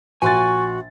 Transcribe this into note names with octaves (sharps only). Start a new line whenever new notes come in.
A#1 F#4 G#5 C6 C#6 A6